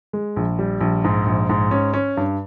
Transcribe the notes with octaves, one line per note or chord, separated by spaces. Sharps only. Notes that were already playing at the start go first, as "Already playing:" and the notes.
G#3
A#1
G3
A#1
G#2
A#1
G#2
C#4
C#4
G2